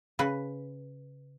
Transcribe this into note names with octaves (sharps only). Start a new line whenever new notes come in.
C#3 B4